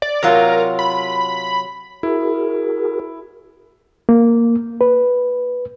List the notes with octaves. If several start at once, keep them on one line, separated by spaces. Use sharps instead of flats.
D5
C3 F#3 F4 A#4
B5
E4 F#4 G#4 A#4
A#3
B4